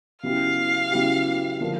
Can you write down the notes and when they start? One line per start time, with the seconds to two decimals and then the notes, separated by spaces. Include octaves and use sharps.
0.23 C#3 F#3 B3 E4 G4 F5
0.92 C#3 F#3 B3 E4 G4
1.61 D3 F3 A#3